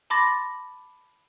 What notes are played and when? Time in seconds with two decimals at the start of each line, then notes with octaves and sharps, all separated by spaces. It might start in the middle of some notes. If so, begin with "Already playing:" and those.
0.10 A5 B5 C6 D6 A6 A#6